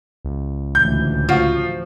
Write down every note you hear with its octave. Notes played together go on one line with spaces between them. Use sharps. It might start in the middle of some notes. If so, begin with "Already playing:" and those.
C#2
D2 A2 E3 G6
F3 F4 F#4